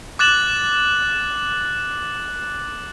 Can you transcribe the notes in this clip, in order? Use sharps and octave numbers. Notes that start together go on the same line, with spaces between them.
D6 F#6 A6 E7 F#7